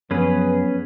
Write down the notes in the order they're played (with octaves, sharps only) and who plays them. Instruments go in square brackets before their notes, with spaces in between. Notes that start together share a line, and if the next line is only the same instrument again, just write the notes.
[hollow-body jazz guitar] F#2 [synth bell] F3 F#3 [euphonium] B3 [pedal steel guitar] C#4 G#4 B4